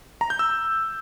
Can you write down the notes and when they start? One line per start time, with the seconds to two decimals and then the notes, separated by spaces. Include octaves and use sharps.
0.21 A#5
0.30 G6
0.39 E6